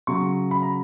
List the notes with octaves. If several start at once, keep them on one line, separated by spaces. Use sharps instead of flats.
C#3 F#3 C#6
B5
A#5